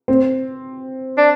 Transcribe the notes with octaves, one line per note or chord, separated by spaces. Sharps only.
C4
D4